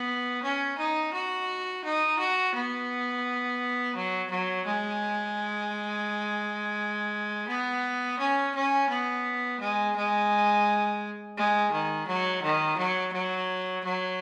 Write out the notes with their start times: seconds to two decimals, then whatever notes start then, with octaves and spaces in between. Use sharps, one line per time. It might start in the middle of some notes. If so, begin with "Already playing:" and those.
Already playing: B3
0.43 C#4
0.77 D#4
1.13 F#4
1.84 D#4
2.19 F#4
2.54 B3
3.95 F#3
4.30 F#3
4.66 G#3
7.48 B3
8.19 C#4
8.55 C#4
8.89 B3
9.60 G#3
9.96 G#3
11.37 G#3
11.72 D#3
12.07 F#3
12.42 D#3
12.77 F#3
13.13 F#3
13.84 F#3